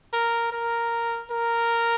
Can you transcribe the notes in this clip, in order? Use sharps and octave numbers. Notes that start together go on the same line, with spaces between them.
A#4
A#4
A#4